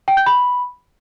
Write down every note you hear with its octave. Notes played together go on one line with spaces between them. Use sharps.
G5
G6
B5